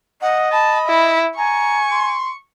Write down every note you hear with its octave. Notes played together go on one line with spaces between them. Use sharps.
D#5 F#5
A5 B5
E4
G#5 A#5 C#6
C6